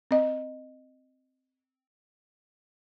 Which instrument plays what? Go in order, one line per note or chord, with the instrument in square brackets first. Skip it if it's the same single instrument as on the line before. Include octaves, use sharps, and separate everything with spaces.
[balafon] C4 D#5